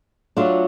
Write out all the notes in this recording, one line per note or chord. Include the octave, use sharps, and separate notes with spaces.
F#3 A3 D4 F4